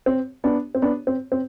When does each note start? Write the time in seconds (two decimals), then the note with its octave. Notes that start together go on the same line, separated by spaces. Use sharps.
0.06 C4
0.44 B3 D4
0.75 C4
0.82 B3 D4
1.07 C4
1.32 C4